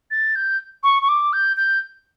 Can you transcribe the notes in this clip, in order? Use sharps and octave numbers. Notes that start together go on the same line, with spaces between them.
A6
G6
C#6
C#6
D6
G6
G6